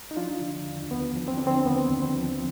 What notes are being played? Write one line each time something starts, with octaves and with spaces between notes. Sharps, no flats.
D#4
F3 D4 F4
D3
D#2
D#2 B3
F3
C4
D3 D4
C4
D#2 B3
D#2
C4
F3